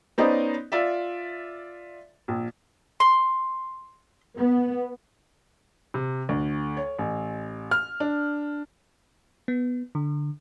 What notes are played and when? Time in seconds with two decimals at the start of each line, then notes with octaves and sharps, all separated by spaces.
0.18 B3 C#4 D#4 C5 D5 D#5
0.72 F4 D5 E5
2.28 A#1
3.00 C6
4.37 B3
5.94 C3
6.29 D2
6.77 C#5
6.99 A1
7.71 F6
8.00 D4
9.48 B3
9.95 D3